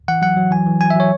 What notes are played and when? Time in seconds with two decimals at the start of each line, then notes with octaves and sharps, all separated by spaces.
0.08 E3 F#5
0.22 F#3 F#5
0.37 F#3
0.51 E3 G#5
0.67 E3
0.80 F#3 G#5
0.90 E5
0.96 F#3 C#5